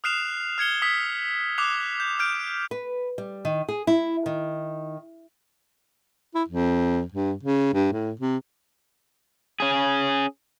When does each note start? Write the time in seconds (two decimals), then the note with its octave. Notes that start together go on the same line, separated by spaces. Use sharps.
0.04 D#6 F6 F#6 C7 E7 F7
0.58 F6 G#6 C#7 G7
0.82 D#6 E6 B6
1.58 D6 D#6 F#6 C7 F7
2.00 G6
2.19 F6 G6 D7
2.71 B4
3.18 G3
3.45 D#3
3.69 G#4
3.87 E4
4.26 D#3
6.35 E4
6.49 F2
7.12 G2
7.43 C#3
7.74 G2
7.92 A2
8.20 C3
9.60 C#4 G#4